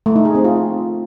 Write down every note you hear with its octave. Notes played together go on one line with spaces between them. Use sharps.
A3
D#4
G#4
C4
F4